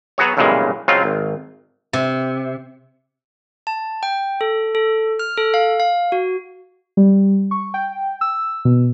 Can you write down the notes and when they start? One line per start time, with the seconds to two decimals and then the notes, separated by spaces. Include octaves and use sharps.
0.18 F#3 B3 F#4 G#4 C#5
0.37 B1 G2 A#2 C#3 E3 G#3
0.88 C#3 F#3 G#3 C4 F4
1.04 G#1
1.93 C3
3.67 A5
4.03 G5
4.41 A4
4.75 A4
5.19 F6
5.37 A4
5.54 F5
5.80 F5
6.12 F#4
6.97 G3
7.51 C#6
7.74 G5
8.21 E6
8.65 B2